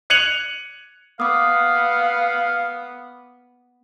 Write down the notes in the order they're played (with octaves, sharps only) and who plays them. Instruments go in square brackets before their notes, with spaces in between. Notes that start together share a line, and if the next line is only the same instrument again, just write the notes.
[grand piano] F#6 G#6 C#7 D#7 F7 F#7
[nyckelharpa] B3 [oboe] F5 [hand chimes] D6 D#6